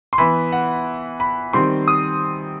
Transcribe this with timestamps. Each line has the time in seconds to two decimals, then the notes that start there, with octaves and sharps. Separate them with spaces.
0.13 C6
0.18 E3 B3 B5
0.52 F#5
1.20 B5
1.53 D#3 G3 C4 C6
1.88 D#6